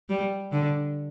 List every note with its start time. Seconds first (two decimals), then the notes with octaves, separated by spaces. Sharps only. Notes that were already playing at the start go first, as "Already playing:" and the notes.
0.09 G3
0.52 D3